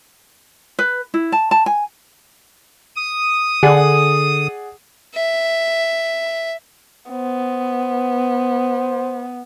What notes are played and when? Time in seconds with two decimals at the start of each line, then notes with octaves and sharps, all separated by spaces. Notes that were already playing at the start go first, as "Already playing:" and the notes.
0.79 B4
1.14 E4
1.32 A5
1.51 A5
1.66 G#5
2.96 D#6
3.63 D3 G#4 D5 F#5
5.14 E5
7.11 B3 C5